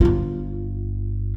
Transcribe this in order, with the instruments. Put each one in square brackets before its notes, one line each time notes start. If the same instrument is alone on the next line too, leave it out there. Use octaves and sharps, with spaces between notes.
[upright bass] G1 F4